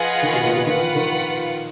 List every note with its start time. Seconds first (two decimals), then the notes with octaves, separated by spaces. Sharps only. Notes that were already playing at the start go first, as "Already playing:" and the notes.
Already playing: F3 F4 G#4 B4 D#5 F#5
0.22 D#3
0.34 B2
0.44 A#2
0.56 B2
0.66 D#3 F4 B4 F#5
0.81 F3
0.95 D#3